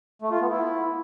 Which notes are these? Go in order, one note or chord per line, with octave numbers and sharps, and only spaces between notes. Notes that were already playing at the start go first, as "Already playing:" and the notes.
A3
F4
B3
E4